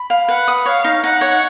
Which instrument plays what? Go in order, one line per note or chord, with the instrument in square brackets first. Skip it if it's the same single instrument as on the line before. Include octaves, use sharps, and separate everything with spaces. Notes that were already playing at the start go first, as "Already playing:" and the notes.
Already playing: [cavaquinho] B5
F5
[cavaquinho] B4 [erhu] F#5
[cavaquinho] D#6
[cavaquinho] C#5 [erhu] F5
[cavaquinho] D#4
[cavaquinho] D#4 [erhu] F#5
[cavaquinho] C#5